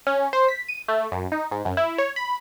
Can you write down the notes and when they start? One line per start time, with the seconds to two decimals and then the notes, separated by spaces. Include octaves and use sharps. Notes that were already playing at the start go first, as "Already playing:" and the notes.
0.07 C#4
0.33 C5
0.48 B6
0.68 D#7
0.88 A3
1.12 F#2
1.32 D#4
1.51 G#2
1.65 F#2
1.77 E4
1.98 C#5
2.16 B5